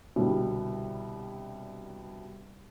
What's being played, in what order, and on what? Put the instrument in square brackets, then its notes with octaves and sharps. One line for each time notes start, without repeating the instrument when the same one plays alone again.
[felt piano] C2 B2 D3 G3